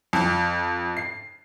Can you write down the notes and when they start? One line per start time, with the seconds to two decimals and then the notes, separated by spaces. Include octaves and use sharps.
0.13 F2
0.97 C7